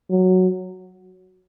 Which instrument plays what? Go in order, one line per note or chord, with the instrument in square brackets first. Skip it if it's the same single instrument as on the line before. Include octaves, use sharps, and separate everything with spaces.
[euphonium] F#3